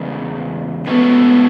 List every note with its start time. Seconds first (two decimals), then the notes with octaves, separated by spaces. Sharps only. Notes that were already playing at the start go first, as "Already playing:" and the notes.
Already playing: E2 C#3 G#3
0.86 A2 G#3 B3 C#4 F#4 A4